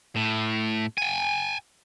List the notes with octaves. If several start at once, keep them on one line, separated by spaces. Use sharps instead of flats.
A2
G5 G#5